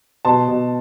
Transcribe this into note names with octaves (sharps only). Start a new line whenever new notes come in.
B2 A5 C6
B2